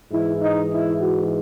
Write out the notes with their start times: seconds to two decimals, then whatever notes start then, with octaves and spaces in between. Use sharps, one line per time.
0.11 G#2 E3 E4
0.41 D#4
0.71 E4
1.00 F#4